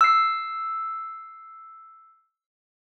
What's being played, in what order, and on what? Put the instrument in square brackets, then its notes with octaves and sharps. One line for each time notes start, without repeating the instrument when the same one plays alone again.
[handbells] E6 C7